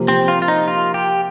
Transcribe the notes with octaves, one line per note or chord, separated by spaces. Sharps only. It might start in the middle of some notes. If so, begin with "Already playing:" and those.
Already playing: C3 F3 A#3
C4
F4
F4
D#4
F4
G4